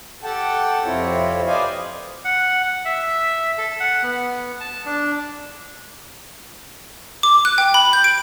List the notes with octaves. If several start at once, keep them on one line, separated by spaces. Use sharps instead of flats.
G4 A4 F#5 G5 A5
F2 C3 C4 E4 F4 C#5
B4 C5 D5 D#5 F5 G#5
F#5
E5
A4
F#5
B3
A5
D4
D6
F#6
G5
B5
G6
D7